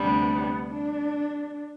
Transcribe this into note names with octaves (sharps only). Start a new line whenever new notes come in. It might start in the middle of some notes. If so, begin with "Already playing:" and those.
Already playing: D2 C3 G3 B3 D4
D4